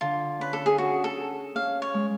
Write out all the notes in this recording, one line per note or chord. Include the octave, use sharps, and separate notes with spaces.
D3 F4
C#4 B4
A4
G#4
C#4 F#4
A4
G#4
C#4 F5
C#5
G#3